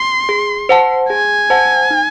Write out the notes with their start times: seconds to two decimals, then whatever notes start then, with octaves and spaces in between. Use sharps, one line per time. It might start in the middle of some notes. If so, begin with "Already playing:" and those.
Already playing: C6
0.29 G#4
0.69 C5 F#5 A5
1.09 G#4 G#5
1.50 C5 F#5 A5
1.90 D#4